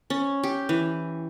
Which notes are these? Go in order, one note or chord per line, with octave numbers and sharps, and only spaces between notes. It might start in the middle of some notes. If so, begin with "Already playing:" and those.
C#4
G4
E3